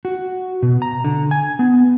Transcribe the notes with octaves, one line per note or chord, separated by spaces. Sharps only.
F#4
B2
A#5
D3
G#5
B3